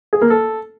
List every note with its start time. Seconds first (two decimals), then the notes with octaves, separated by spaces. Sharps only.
0.13 G#4
0.21 A#3
0.30 A4